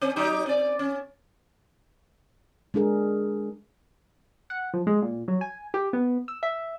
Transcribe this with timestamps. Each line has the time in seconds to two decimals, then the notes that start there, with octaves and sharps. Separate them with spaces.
0.02 C4
0.16 F#3 D#4 G4
0.46 C4 D5
0.79 C#4
2.74 G#3 D4 G#4 A#4
4.50 F#5
4.74 F3
4.87 G#3
5.02 A#2
5.28 F#3
5.41 G#5
5.74 G4
5.93 B3
6.28 E6
6.43 E5